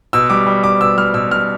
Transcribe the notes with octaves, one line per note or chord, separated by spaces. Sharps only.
B2 E6
G3 D6
G3
G3 D6
B2 E6
G3 F6
B2 E6
G3 F6